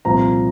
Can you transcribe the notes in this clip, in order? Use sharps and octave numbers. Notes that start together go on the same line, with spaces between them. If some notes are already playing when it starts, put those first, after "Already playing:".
C2 A#2 F3 A#5